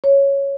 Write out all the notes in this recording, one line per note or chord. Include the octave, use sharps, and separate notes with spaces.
C#5